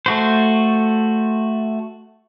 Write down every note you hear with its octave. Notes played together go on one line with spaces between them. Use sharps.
A3 F#4 C5